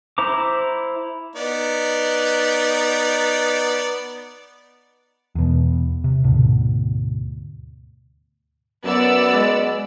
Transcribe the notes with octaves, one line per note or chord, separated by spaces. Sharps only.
E4 C5 A#5 D6
B3 D#4 D5
E2 B2
C3
D2 G#2 B2 D3
F#2 B3 D5 E6
G#3